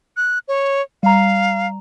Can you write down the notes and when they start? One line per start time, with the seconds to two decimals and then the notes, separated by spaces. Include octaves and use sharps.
0.17 F#6
0.48 C#5
1.03 G3 F5 A#5